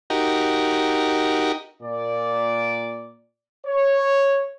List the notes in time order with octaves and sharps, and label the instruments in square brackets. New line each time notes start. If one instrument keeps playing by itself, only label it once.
[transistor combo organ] D#4 F#4 G4 A#4
[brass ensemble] A#2 D5
C#5